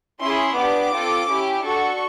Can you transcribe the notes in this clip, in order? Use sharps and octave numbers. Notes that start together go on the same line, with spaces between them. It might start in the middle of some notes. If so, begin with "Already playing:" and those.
C#4 E4 G#4 C6
B3 D4 G4 D6
C4 F4 A4
C#4 E4 G4
D4 F#4 A4 C#6